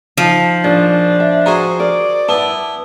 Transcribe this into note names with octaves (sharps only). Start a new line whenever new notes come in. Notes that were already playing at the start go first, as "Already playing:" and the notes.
F3 D#4
A#1 D4
E5
F#4 G#4 C5 A#5
A#4 D5
B3 E4 A5